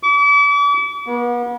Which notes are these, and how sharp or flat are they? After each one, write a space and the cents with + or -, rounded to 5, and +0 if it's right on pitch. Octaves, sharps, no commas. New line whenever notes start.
D6 -40
B3 -40